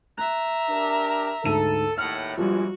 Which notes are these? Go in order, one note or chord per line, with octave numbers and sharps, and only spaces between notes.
E5 A#5 F#6
D4 G4 A#4
D2 G#2 A4 D#7
D#2 A2 F#5 F6
A#1 E2 F3 G3 G#3 F#4